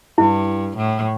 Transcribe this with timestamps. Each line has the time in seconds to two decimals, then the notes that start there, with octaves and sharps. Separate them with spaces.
0.18 G2 E4
0.77 A2